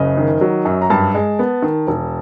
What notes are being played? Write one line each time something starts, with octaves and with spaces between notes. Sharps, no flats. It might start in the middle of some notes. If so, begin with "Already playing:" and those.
Already playing: F#1 C#3 D#5
D#3
F#3
F#2
A#5
G2 A5
G#3
B3
D#3
E1